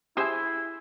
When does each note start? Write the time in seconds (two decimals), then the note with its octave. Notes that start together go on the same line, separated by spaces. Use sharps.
0.17 E4 G4 G#4 C5 E5 G#5